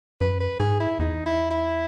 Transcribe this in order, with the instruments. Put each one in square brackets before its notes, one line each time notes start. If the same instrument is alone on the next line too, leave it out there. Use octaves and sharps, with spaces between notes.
[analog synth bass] F#2 [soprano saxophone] B4
[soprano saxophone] B4
[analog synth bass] G#2 [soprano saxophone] G#4
[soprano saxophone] E4
[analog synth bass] E2 [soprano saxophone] D#4
[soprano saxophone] E4
E4